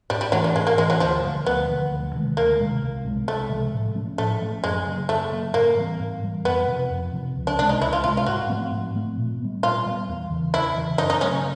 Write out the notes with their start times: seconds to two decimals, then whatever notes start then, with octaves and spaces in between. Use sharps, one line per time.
0.10 G#2 G3
0.21 G3
0.32 E3 F#3 A3 D4
0.44 G3
0.56 G#2 G#3
0.67 A#3
0.78 E3 G#3 A3 D4
0.90 F#3
1.00 D2 F3
1.23 D3 F3
1.45 D2 B3
1.68 D3 F3
1.91 D2
2.14 C3 D#3 G#3
2.37 D2 A#3
2.60 C3 D#3 G#3
2.82 C2
3.04 C3 F3 G#3
3.27 C2 A3
3.50 C3 F3 G#3
3.73 A2
3.95 F3 A3 C#4
4.18 A2 A3
4.41 F3 A3 C#4
4.64 F#2 G#3
4.87 C#3 F#3 A#3
5.09 F#2 A3
5.31 C#3 F#3 A#3
5.54 G#2 A#3
5.77 E3 G3 C4
6.00 G#2
6.23 E3 G3 C4
6.44 F2 B3
6.67 C3 F3
6.90 F2
7.13 C3 F3
7.36 C#2
7.47 D4
7.59 C3 E3 G#3 D4
7.69 D#4
7.81 C#2 E4
7.93 F4
8.04 C3 E3 G#3 F4
8.17 F4
8.26 G#2 F#4
8.49 F3 A3 C4
8.71 G#2
8.95 F3 A3 C4
9.17 A#2
9.40 G3 B3
9.63 A#2 F4
9.86 G3 B3
10.08 E2
10.30 C#3 E3
10.53 E2 E4
10.77 C#3 E3
10.98 F#2 D#4
11.10 D#4
11.21 C#3 F#3 A3 C#4